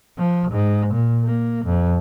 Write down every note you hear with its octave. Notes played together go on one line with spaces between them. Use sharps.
F3
G#2
A#2
A#3
F2